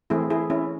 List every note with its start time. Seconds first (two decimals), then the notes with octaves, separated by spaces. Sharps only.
0.10 E3 A3 C4 E4 G#4
0.30 E4 G#4
0.50 C#4 E4